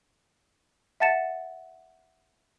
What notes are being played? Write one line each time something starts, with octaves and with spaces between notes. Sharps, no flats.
E5 F#5 A5 A6 C#7 E7